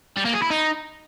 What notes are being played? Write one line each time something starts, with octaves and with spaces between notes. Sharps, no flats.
G3
A#3
G#4
E4
D#4